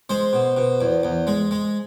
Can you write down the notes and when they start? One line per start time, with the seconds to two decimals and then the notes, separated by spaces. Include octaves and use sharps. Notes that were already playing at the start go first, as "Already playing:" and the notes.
0.10 G#3 C5
0.33 B2
0.57 B2
0.81 E2
1.03 E2
1.27 G#3
1.51 G#3